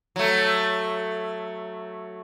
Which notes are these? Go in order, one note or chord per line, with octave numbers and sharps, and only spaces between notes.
F#3 A3